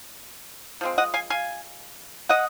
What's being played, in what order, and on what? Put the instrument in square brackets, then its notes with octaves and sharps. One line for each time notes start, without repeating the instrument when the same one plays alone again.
[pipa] F3 G#3 C4
D#5 F#5
F5 G#5
F5 G#5
D#5 F#5